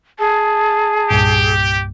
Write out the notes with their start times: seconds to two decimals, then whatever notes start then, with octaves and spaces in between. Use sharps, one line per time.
0.19 G#4 A5
1.11 C2 G2 A#2 G4